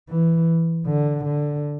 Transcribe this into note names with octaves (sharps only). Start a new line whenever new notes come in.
E3
D3
D3